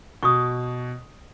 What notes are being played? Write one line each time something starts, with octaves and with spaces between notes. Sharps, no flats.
B2 C#6 D#6